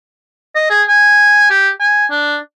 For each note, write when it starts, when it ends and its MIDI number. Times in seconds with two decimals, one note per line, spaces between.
0.56 0.67 75
0.70 0.83 68
0.89 1.50 80
1.51 1.70 67
1.80 2.06 80
2.11 2.38 62